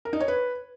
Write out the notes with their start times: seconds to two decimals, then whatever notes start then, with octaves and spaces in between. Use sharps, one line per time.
0.05 A#4
0.13 D#4
0.20 C#5
0.28 B4